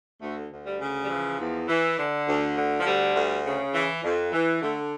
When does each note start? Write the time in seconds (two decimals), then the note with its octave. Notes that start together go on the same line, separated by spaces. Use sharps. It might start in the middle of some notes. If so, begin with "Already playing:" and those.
0.21 D2 A3
0.50 D2
0.65 G3
0.80 C#3
1.04 G3
1.09 E3 F3
1.39 E2
1.68 E3
1.98 D3
2.27 D2
2.56 D3
2.80 F3
2.86 D2 G3
3.15 D2
3.44 C#3
3.74 E3
4.04 F2
4.32 E3
4.62 D3 A3